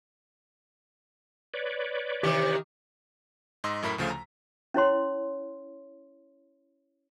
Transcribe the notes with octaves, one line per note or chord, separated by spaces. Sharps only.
B4 C#5 D5
C3 D#3 E3 G4 D6
G#2 D#5 C6 E6
F#2 A2 E4 A#4 B5 B6
D2 C#3 F3 A3 F5
A#5
C#4 E4 C#5 C6